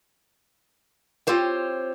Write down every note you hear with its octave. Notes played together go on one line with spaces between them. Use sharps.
C4 F4 G4 C5 C#5